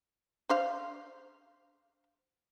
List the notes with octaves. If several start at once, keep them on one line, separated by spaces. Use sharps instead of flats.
D4 C5 F5